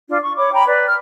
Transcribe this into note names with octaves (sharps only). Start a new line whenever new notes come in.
D4 F4
C#6
C#5 B5 D6
G5 A#5 B5
B4 D5
F6